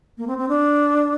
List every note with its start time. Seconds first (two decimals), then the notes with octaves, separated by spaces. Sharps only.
0.18 A#3
0.27 C4
0.38 C4
0.48 D4